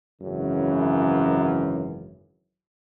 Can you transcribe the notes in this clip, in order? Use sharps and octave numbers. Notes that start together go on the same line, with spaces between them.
G#1 F#2 C#3 E3